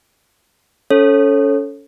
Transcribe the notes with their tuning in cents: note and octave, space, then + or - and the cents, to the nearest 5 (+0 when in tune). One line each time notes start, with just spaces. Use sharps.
C#4 +25 A4 +0 C#5 -25